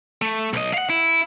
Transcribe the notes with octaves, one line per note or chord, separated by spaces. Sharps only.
A3
B1 D#5
F5 F#5
E4